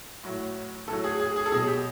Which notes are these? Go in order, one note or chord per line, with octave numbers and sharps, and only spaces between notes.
A2 F#3
A2 F#3 A4
G#4
G#4
G#4
A4
B2 F#3 G#4
G4